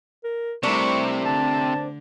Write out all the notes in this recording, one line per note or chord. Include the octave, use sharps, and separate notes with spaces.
A#4
C3 G3 A3 C4 D4 E4 A#4 C#6
D3 A5